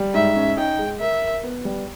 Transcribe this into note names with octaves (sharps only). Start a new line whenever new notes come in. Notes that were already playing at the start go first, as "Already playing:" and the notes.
Already playing: G3
G#2 E5
C#4
D#4 G5
G#3
A#4 E5
A#4
B3
G3